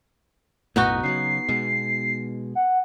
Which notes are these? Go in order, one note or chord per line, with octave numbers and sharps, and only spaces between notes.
B1 F#2 A2 B3 D#4 F#4
C#3 E3 F#3 C7
B2 G#3
F#5